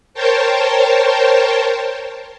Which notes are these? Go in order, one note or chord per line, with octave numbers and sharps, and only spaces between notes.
A#4 C5 C#5 G5 A5